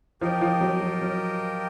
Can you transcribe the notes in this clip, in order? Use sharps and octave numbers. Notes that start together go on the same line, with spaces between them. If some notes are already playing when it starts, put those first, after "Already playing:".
F3 G4 A#4 D#5 G5
F3
F#3
F#3
F#3